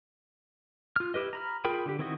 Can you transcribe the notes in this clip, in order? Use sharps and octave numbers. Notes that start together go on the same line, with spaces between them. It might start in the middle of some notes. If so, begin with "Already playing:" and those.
F4 F6
E4 G4 B4 D#5
A#5 B5 F6
F4 G#4 A#4 G5 B5
D3 G4
D#3 C4 E4 F#4 D#5